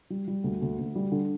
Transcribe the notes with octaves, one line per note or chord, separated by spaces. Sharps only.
G3
G3
D2
D2
D2
G3
D3